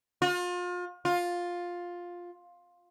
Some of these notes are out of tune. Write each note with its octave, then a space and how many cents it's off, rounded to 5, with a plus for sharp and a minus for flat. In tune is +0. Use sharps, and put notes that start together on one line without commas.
F4 +35
F4 +10